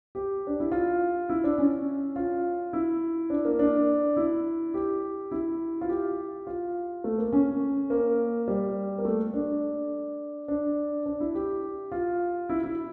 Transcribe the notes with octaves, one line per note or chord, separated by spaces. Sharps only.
G4
D4
E4
F4
E4
D4
C#4
F4
E4
D4
A#3
D4
E4
G4
E4
F4
G4
F4
A3
A#3
C#4
A#3
G3
A#3
A3
D4
D4
D4
E4
G4
F4
E4
E4